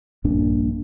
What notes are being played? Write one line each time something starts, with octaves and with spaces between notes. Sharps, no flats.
A#1 G2 A#2 D4